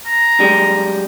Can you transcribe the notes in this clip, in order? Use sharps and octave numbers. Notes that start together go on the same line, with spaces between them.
A#5
F#2 G3 G#3